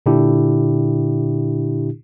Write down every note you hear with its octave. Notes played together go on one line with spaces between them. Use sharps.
A#2 D3 D4 E4 G4